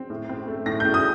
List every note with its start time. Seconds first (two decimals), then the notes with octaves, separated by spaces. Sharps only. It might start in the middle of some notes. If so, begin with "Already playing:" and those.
Already playing: C4
0.10 A2
0.29 C4
0.48 A3
0.66 A2 A#6
0.80 A2 G6
0.94 D#6